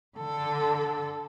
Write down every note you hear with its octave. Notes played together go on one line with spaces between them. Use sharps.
D3 A4